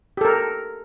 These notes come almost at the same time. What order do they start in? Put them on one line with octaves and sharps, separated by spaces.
G4 A4 A#4